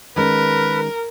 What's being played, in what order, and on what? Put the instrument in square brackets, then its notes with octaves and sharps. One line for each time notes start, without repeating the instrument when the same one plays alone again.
[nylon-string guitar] D#3 G#3 C#4 [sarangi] A#4 [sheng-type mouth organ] B4